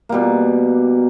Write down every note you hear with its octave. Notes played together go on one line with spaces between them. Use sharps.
B2 G3 A#3